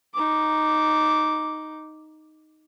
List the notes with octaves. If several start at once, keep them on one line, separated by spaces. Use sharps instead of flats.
D#4 D6